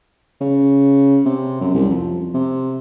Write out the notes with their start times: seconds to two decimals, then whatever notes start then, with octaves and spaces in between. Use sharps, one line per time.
0.41 C#3
1.25 C3
1.61 F#2
1.74 C2
1.90 F2
2.34 C3